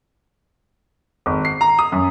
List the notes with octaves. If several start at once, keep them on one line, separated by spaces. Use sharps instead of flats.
G#1
C7
A#5
D#6
F#2